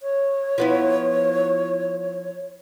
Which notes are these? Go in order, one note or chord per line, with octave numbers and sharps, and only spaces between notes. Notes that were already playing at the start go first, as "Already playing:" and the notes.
C#5
F3 B3 E4